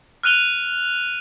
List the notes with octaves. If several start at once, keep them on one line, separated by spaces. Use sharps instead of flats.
F6 F#6 D#7 F7 G7